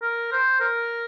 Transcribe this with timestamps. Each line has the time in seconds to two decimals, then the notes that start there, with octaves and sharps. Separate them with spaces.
0.02 A#4
0.32 C5
0.60 A#4